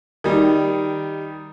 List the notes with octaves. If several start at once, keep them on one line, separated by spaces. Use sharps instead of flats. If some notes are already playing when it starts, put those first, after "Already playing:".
D#3 G3